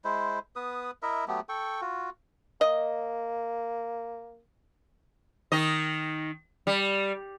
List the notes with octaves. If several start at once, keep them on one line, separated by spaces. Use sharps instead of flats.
G#3 E4 C5
B3 B4 D#6
E4 A#4 D#5 E5
F#3 A3 B3 G4
A4 G5 C#6
F4 F#4
A#3 D#5
D#3 D#4 D#5
G3